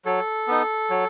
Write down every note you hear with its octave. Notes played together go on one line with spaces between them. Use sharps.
F#3 A4
B3 D#4
F#3